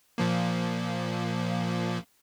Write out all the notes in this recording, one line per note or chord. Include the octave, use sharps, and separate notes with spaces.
A#2 F3 A#3